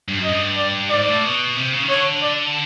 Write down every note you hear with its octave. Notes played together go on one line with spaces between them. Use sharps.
G2
F#2
G2 D#5
D5
G#2 D5
A2
B2
C3
C#3
D#3
D3 C#5
D5